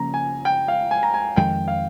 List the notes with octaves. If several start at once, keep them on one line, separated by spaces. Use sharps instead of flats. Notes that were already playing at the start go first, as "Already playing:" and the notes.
Already playing: C#3 F3 A#3 C#4 A#5
G#5
G5
F5
G#5
A#5
G#5
F2 D#3 G#3 G5
F5